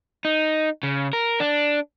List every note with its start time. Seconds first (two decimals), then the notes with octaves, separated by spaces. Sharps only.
0.25 D#4
0.83 C#3
1.13 A#4
1.40 D4